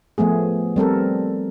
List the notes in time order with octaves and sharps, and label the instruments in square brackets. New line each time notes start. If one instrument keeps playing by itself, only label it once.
[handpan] F3 A3 B3 G#4
G3 C4 A4 A#4